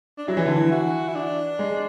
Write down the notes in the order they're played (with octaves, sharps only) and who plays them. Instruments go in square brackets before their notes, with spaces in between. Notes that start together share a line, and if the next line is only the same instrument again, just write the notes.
[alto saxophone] D4
[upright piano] F#3 [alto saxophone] E4
[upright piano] E3
D3
E3
[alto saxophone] F#4
E4
D4
[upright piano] G#3